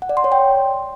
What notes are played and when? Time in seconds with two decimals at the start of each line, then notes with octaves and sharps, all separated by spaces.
0.02 F#5
0.09 D5
0.17 C6
0.24 C#5
0.32 G5